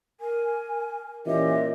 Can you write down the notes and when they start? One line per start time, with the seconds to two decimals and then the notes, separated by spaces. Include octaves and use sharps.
0.21 A#4 G#5
1.26 A#2 E3 C#4 G4 D#5 E5